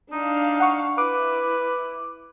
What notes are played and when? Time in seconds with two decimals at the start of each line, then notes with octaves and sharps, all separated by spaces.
0.12 D4 D#4 F5
0.60 F#5 C#6
0.98 E4 B4 D6